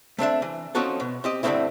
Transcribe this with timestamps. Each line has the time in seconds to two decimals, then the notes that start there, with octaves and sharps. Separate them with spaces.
0.18 A3 C4 D4 E5
0.42 E3
0.75 F3 C4 C#4 D#4 F#4 A4
1.00 B2
1.24 C4 G4 D#5
1.43 G2 D3 F3 A3 C4 E4